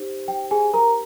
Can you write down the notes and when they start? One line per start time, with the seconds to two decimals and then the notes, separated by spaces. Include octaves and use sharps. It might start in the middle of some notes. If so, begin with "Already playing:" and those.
Already playing: D#4 G4 C5
0.28 G5
0.51 G#4 G#5
0.74 A#4 A#5